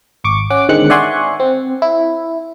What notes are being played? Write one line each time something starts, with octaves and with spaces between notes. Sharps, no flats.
G#1 C#6 D6
C#4 F#5 D6
D3 D#3 G#3 C4 F#6 C#7
D5 E5 F#5 G#5 C6 C#6
C4
E4